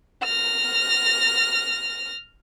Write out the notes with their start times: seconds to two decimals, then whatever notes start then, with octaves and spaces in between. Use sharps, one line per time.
0.24 F6 A#6